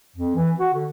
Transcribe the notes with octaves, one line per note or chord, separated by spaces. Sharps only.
F2
E3
F#4
D3